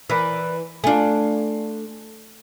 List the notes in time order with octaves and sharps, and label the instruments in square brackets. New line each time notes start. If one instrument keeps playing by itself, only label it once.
[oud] E3 [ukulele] A#4 B4 D5
[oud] A3 D4 [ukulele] F4 G#5